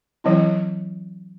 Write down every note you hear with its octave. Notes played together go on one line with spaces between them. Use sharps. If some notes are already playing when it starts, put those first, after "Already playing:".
E3 F#3 C4 E4